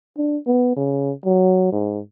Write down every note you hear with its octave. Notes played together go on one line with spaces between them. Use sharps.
D4
B3
C#3
F#3
G#2